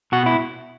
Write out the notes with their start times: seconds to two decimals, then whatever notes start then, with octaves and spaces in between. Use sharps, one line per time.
0.12 B2 F#4
0.26 E4